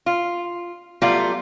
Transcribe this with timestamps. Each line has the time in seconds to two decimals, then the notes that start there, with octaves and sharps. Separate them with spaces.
0.06 F4
1.02 F#3 G3 A3 B3 F4 D5